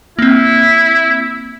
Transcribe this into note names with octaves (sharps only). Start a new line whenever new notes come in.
A#3 C4 E4